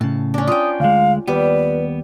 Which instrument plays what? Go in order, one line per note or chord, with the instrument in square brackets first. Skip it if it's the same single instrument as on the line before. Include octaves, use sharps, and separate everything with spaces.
[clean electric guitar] A2 C#3 [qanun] A5
[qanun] C#4 D4
[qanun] F4 G5 [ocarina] D#6
[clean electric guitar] D2 G#3 [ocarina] F5
[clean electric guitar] D#2 B3 [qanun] G3 [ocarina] B4